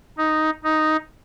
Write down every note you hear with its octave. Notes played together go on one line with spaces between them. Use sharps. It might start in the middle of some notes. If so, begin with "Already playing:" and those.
D#4
D#4